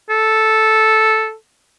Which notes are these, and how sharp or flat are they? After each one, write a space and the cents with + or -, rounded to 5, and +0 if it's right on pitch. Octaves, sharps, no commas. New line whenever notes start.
A4 -5